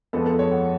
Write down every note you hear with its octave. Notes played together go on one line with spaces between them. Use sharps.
F2 F3 G#3 B3 A4
A4
C#5
F#5